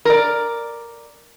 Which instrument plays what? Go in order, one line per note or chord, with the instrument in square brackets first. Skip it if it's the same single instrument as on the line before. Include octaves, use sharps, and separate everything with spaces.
[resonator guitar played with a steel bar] A#4 D5